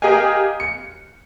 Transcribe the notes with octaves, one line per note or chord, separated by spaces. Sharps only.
G4 G#4 A#4 D#5 F5 G#5
C#7